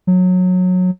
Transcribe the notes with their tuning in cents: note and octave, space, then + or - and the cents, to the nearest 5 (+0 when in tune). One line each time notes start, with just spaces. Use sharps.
F#3 -20